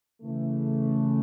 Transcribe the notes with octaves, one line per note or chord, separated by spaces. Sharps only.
C#3 E3 A3